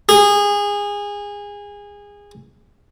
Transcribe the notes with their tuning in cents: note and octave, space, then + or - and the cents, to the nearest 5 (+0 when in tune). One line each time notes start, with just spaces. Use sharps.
G#4 -25